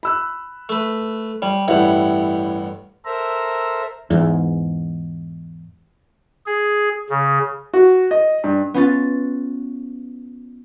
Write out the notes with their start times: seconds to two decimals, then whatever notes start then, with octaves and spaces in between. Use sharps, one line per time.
0.03 B5 E6 F#6
0.69 A3 B4
1.42 G3 C#5
1.68 A1 G2 E4 G4 C#5 F#5
3.05 A4 A#4 C5 E5 A#5
4.10 E2 G#2
6.46 G#4
7.10 C#3
7.74 F#4
8.11 D#5
8.44 G2
8.74 B3 C#4 F4 A6